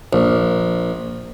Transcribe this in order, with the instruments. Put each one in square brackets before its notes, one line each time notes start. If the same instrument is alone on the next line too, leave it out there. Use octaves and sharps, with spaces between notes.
[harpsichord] A#1